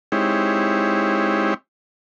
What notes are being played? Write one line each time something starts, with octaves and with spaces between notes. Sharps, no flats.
G#3 C4 D#4 E4 G4 C#5